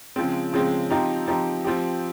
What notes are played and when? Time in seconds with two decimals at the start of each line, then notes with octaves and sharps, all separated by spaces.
0.16 C#3 F3 G#3 C4
0.53 C#3 F3 G#3 C4
0.90 F3 C4 D#4 G4
1.27 F3 C4 D#4 G4
1.65 F3 C4 G4